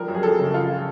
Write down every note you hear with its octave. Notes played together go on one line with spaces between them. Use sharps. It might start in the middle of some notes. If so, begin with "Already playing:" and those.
Already playing: F3 G3 A#4
F#2
G#4
F#2 A4
C#3
F3 F4